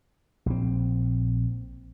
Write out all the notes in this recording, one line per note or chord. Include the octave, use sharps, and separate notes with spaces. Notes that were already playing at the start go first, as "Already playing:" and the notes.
A#1 C4